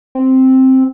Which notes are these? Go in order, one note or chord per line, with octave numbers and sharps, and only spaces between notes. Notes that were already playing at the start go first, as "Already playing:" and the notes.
C4